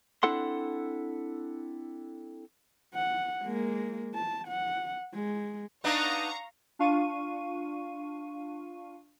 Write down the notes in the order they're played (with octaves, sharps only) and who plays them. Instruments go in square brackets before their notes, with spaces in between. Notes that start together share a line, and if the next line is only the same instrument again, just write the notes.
[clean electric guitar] C4 D4 E4 A4 F#5 C6
[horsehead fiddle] F#5
G#3 A#3
A5
F#5
G#3
[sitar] B3 D4 D#4 [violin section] F5 A#5 C#6
[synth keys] D4 F4 F5 C#6 D#7